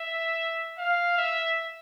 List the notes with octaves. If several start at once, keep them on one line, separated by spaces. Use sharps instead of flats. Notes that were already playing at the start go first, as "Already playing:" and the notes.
Already playing: E5
F5
E5